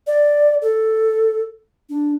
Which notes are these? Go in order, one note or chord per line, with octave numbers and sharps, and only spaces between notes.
D5
A4
D4